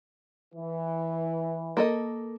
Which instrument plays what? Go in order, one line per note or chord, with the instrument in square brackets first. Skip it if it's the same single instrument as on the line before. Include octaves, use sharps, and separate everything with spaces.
[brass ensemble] E3
[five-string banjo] A#3 A4 D#5